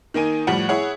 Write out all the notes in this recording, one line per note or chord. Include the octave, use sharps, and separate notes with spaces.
D#3 A#3 D#4 G#5 D#7
A2 F3 G3 F#5
E4 G#4 C#5 F#5